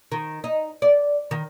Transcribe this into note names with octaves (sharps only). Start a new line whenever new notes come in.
D#3
D#4
D5
D#3